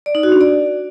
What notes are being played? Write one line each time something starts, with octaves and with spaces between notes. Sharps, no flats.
D5
D#4
F#4
D4
D5